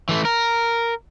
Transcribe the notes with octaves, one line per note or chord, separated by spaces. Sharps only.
E3 A3
A#4